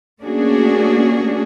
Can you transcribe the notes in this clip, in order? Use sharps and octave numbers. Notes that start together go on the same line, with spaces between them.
A3 A#3 C#4 D4 F#4 G#4